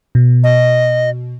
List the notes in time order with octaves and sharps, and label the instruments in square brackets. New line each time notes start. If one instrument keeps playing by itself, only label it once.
[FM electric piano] B2
[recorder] D#5